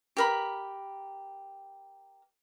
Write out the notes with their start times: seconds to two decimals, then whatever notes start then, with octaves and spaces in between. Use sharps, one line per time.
0.17 G4 A#4 B5